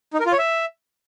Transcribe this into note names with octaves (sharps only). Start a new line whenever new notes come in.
D#4
A#4
F4
C#5
E5